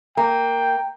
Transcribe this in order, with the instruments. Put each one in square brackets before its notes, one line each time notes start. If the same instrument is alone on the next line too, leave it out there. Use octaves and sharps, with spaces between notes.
[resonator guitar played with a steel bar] A#3 [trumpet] G5